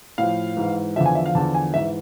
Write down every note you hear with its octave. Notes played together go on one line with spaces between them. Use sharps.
A2 F3 F5
G#2 E3
E2 D3 F3 E5
G#5
E5
F5
E2 D3 F3 A5
G#5
G#2 E3 E5